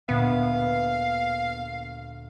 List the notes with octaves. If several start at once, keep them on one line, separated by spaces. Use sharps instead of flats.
D2 A#2 B3 F5